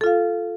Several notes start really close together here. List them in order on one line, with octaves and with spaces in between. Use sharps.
A4 F4 F5